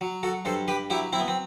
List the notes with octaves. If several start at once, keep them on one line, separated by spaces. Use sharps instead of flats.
F#3
F#4 A4
G2 A4 C5
G4 B4
F#3 E4 G4
C4 E4
B3
C4